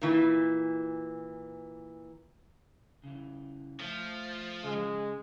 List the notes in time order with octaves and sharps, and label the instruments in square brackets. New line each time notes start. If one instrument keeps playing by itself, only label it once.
[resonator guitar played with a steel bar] A#2 E3
[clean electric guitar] C#3 E3
[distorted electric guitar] F3 [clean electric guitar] A3
[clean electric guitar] C#3 [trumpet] G#3